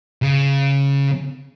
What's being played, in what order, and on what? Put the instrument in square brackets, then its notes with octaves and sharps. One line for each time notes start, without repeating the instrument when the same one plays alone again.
[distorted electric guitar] C#3